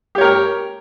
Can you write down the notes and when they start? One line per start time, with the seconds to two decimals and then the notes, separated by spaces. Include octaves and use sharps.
0.15 G4
0.18 C#5
0.21 A#4
0.24 G5